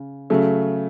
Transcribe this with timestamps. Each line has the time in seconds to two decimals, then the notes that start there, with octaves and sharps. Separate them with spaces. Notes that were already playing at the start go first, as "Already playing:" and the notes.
Already playing: C#3
0.30 C#3 F#3 A3